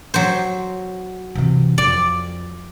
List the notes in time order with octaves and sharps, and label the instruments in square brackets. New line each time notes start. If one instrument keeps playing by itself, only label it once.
[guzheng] F#3 C5
[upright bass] C3 E3
[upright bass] F2 [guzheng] D5